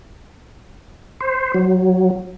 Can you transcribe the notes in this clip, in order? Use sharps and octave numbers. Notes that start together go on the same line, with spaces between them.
C5
F#3